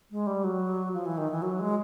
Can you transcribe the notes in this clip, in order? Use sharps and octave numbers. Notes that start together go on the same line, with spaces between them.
G#3
G3
F#3
F3
E3
D#3
E3
F#3
G#3